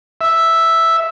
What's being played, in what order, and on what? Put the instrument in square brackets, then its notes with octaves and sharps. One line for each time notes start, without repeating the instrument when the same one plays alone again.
[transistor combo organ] E5